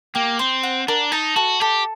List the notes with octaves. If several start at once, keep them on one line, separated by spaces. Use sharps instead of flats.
A#3 G4
C4 C5
F#5
D4 A#4
D#4 A5
F#4 A4
G4 A4